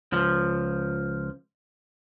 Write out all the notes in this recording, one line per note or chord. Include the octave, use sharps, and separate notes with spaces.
C#2 F3